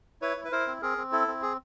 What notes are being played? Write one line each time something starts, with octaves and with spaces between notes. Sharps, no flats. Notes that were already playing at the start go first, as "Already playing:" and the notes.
E4 B4 C#5
E4
B4
E4 A#4 C5
C4
C4 G#4 A#4
C4
E4 A4
C4
G#4